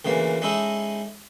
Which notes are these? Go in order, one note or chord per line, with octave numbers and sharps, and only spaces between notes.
D2 C#3 E3 A#3
G#3 C#4 D#4 E4 A4